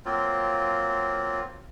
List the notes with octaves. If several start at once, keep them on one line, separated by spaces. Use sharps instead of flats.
F#3 A#3 C4 F4